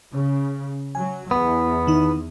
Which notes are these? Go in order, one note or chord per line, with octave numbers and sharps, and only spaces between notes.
C#3
F#3 G#5
E2 B3
D#3 D#4